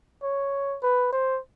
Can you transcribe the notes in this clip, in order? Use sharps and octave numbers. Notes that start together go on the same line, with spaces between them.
C#5
B4
C5